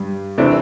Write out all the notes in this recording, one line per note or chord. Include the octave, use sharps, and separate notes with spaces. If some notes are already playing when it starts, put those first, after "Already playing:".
Already playing: G2 G3
C3 E3 A3 D4